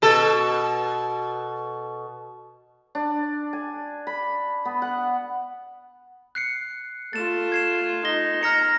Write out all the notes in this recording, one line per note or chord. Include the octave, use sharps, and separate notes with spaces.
B2 A4
D4
G#5
B5
B3
F#5
F#6 C7 C#7
A3 F4 A6 E7
G#6 C7 E7
D#4 A#6 G7
A#5 F6 A#6 C#7